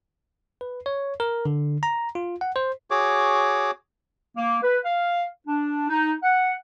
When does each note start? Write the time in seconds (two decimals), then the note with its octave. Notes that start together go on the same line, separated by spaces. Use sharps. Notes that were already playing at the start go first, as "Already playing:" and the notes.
0.61 B4
0.86 C#5
1.20 A#4
1.46 D3
1.83 A#5
2.15 F4
2.41 F#5
2.56 C5
2.91 F#4 G#4 C#5 D6
4.36 A#3
4.63 B4
4.85 F5
5.47 D4
5.89 D#4
6.23 F#5